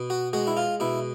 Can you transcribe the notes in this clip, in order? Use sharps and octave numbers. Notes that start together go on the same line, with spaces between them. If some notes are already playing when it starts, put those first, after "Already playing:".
Already playing: B2
F#4
G#3 F#4
E4
F4
B2 E4